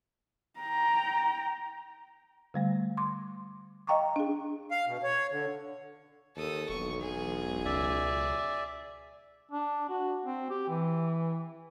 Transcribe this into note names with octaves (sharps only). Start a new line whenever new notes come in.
G5 A#5
D3 G3 A3
C6 D6
D#5 F5 G5 A#5 C#6 D6
D4 G#4
F5
B2
C#5
D3
D#2 A4 D#6
E1 B1 C#6
G#4
C#2 D5 E5
D4
F#4
C4
G4
E3